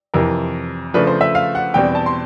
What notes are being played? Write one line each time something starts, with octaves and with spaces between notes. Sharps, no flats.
F2 C3 E3 A#4
C#3 F3 A3 D4 B4
C5
E5
F5
F#5
E2 B2 G3 C4 G5
A5
C6